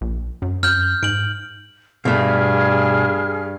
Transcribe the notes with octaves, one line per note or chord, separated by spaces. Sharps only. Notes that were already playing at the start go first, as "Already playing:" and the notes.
A#1
F#2
F#2 F6 G6
G#2 D7 F#7
G2 B2 A3 G#4 F6